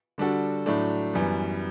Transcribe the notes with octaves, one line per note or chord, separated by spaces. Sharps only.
D3 G3 D4 F#4 A4
A2 F#3 A3 D4
F#2 E3 G3 B3